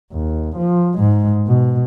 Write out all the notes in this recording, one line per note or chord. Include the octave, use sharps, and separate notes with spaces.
D#2
F3
G#2 G#3
B2